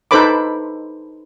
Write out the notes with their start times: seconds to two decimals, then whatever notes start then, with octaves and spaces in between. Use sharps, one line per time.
0.11 D#4 A4 B4 C5 B5 D6